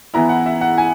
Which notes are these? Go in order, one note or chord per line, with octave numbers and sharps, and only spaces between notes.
E3 B3 E4 A#5
F#5
E5
F#5
G#5